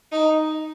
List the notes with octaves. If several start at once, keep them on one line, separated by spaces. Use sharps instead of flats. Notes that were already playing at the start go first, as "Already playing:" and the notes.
D#4